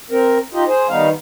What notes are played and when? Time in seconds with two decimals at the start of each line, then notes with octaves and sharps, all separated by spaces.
0.11 C4 A#4
0.53 D#4 F4 G4 D#5
0.67 G#4 C5
0.89 D#3 G3 B3 D#4 F5